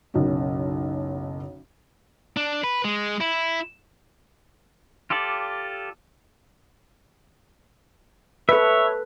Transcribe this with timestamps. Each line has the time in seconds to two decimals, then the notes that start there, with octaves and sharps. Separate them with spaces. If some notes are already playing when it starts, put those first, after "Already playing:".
0.14 F#1 B1 F#2 C#4
2.37 D4
2.64 B4
2.85 G#3
3.21 E4
5.10 F4 G4 A4 D5
8.49 A4 B4 C#5 E5